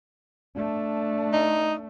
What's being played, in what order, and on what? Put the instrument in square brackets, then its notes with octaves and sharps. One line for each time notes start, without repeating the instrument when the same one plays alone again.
[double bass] A3 D4
[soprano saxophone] D#4